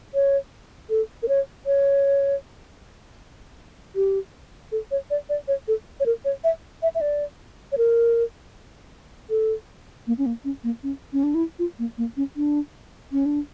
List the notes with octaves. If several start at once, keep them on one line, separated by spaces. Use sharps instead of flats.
C#5
A4
A#4
C#5
C#5
G4
A4
C#5
D5
D5
C#5
A4
C#5
A#4
C#5
E5
E5
E5
D5
C#5
A#4
A4
A#3
C#4
A#3
C#4
A#3
C#4
C#4
D4
E4
F4
A#3
A#3
C#4
D4
C#4
D4